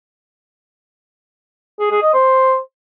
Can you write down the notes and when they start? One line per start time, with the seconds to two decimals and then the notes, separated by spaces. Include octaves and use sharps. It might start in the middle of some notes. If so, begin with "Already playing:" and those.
1.80 G#4
1.91 G#4
2.02 D#5
2.13 C5